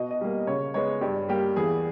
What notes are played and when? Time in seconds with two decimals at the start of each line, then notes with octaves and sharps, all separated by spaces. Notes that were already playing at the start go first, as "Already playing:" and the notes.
Already playing: B2 D#5
0.11 D#5
0.21 G3 A#3
0.47 C#3 C#5
0.74 G#3 B3 C#5
1.01 G2 G4
1.28 G3 A#3 G4
1.56 E2 G#4